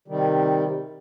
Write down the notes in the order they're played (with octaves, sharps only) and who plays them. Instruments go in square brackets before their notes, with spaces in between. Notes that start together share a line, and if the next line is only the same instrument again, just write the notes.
[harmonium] C3 D#3 G3